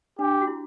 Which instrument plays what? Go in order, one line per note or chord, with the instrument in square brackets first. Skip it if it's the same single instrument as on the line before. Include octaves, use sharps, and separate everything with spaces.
[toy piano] D4 [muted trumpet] G4
[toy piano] F#4
E4